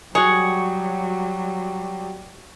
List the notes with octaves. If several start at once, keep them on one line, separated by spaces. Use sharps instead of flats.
F#3 G3 F#4 G#4 C#5